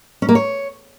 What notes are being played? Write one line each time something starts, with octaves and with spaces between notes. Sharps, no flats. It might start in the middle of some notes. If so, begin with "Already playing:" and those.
C#4
A#3
C#5